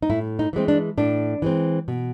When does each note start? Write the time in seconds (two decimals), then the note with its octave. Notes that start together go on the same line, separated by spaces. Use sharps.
0.02 D#4
0.10 A2 E4
0.39 D#4
0.53 E3 G#3 C4
0.68 D4
0.98 A2 D4
1.42 E3 G#3 C4
1.88 B2